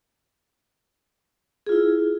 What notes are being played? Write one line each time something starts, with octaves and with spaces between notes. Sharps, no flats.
E4 F4 G#4